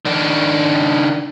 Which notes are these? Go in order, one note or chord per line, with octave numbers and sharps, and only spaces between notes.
D#3 D4